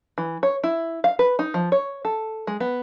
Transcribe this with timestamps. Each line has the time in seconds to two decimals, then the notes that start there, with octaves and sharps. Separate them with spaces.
0.18 E3
0.43 C#5
0.64 E4
1.04 F5
1.19 B4
1.39 D#4
1.54 F3
1.72 C#5
2.05 A4
2.47 G#3
2.60 B3